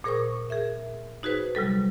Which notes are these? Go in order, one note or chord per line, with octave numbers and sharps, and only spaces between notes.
A#2 G#4 A#4 C5 C#6 D#6
G#4 A#4 E5
D#4 F#4 G#4 B4 C5
C3 F#3 G3 A4